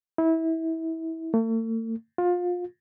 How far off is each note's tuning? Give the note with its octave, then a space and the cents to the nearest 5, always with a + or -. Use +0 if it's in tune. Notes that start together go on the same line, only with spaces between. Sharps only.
E4 -25
A3 +45
F4 +25